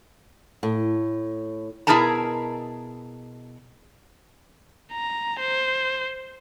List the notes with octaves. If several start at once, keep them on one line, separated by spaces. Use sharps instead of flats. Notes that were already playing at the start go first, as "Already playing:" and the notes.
A2
B2 E4 G#4 A#4 A5 A#5
A#5
C5